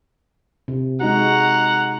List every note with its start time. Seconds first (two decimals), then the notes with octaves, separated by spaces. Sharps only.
0.68 C3
1.01 G#3 D#4 F#4 F#5 A#5